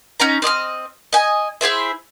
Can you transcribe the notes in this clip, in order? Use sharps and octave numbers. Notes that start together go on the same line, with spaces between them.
C#4 D#4 A#5
C4 D#5 D6 F6
D#5 G#5
E4 G#4 C5 E5